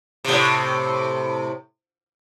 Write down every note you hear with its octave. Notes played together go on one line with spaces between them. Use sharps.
A2 C3